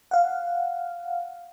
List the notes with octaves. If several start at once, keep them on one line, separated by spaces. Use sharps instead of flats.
F5 F#5